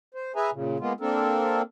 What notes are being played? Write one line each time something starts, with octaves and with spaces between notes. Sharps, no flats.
C5
G#4 B4 E5 G#5 A#5
A#2 C#3
G#3 A#3 B3 F4
A#3 C4 D4 A4 A#4